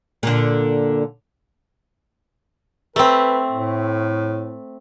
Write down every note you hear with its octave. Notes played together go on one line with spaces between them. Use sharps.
A#2 D3
A3 C4 B4
A2